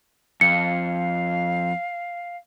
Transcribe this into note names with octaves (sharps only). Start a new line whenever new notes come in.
F2 F5 C#7